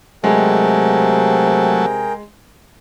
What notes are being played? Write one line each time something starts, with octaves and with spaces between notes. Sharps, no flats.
C3 F#3 G#3 A3 G#4 A#4 G5